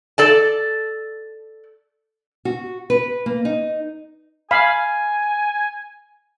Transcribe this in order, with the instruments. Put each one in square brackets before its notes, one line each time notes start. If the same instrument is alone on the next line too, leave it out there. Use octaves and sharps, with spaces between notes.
[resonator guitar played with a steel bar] A4 D5 A5
[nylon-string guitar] F#4
B4
A#3
D#4
[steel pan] F5 B5 [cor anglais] G#5